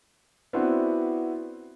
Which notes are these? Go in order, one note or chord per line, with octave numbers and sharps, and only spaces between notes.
B3 C4 D4 E4 F#4 B4